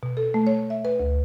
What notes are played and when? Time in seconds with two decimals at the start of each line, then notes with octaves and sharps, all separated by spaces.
0.03 B2
0.17 A4
0.34 A3
0.47 C#5
0.70 E5
0.85 B4
0.99 D2